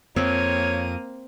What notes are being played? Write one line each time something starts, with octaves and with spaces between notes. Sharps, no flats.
F2 A#3 C4 C#5 D#7